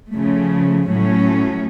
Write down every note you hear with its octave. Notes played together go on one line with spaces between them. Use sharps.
C#3 F3 A3
A2 F#3 A3 C#4